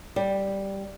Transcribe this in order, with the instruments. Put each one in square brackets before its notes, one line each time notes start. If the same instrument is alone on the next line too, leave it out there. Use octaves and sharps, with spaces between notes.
[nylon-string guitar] G3